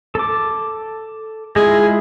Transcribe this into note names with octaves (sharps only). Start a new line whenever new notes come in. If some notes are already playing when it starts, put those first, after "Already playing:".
A4 D6
G#3 E4 F4 G#4